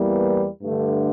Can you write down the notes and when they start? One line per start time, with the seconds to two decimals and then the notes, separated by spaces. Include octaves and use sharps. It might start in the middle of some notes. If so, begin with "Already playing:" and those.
Already playing: E2 E3 G3 A#3
0.62 G2 D3 A3